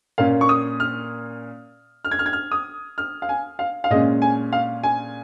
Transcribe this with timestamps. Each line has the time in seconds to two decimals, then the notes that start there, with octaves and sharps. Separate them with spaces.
0.18 A#2 A#3 C#4 F5
0.41 C#6
0.49 D#6
0.80 F6
2.05 F6
2.11 G#6
2.19 F6
2.26 G#6
2.33 F6
2.52 D#6
2.98 F6
3.22 F5
3.29 G#5
3.59 F5
3.84 F5
3.90 A#2 G#3 C#4 D#5
4.22 G#5
4.53 F5
4.84 G#5